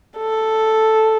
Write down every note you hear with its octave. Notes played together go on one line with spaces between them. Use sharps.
A4